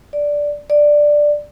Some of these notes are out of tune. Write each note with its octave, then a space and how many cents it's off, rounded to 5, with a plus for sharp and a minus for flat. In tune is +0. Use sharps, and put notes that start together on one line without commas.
D5 -5
D5 +5